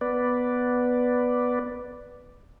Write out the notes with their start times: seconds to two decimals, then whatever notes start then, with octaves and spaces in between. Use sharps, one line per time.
0.01 B3 B4 D5